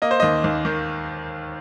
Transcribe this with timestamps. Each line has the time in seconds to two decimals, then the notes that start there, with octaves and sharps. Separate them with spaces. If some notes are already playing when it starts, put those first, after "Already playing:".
0.02 A#3 D#5
0.11 C5
0.20 D#2 D#5
0.44 D#2
0.65 D#3